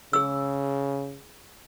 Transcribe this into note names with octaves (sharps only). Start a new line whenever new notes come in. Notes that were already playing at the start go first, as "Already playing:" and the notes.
C#3 G#4 E6